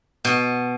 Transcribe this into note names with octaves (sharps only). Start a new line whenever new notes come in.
B2